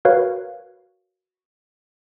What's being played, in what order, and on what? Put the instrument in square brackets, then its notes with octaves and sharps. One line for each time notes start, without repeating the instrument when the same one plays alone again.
[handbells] F#4 A#4 B4 C#5 F5